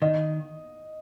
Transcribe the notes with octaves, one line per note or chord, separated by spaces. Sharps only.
D#3 D#5